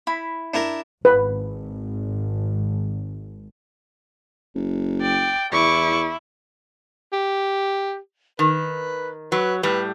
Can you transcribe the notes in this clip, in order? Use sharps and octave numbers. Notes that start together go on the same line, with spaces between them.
E4 B5
D4 E4 A#4
G#1 B4
F#1
D5 G5
E2 E4 C#6 D6
G4
D#3 B4
F#3 B4
A2 G3 B4